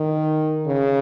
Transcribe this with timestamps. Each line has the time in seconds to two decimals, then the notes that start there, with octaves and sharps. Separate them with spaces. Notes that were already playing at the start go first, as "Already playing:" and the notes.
Already playing: D#3
0.67 C#3